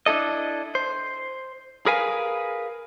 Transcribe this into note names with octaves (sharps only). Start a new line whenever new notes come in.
D4 E4 A4 D#5
C5
G#4 A#4 B4 F5 G#5